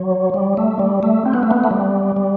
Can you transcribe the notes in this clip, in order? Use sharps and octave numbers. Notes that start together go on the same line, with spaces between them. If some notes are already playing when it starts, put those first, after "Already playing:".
Already playing: F#3
G3
A3
G3
A3
C4
B3
A3
B3
A3
G3
G3